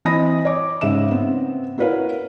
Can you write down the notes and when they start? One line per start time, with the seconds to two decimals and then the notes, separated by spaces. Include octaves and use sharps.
0.05 E3 C4 D#5 B5 D#6 A#6
0.45 C#5 D6
0.81 G#2 C#3 E5 E7
1.11 B3 C4
1.78 E4 F#4 A#4 B4 C#5 F5